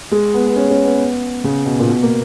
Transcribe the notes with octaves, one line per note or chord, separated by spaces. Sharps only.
G#3
B3
B3
C#4
C#4
B3
C#3
B2
A#2
B2
A#3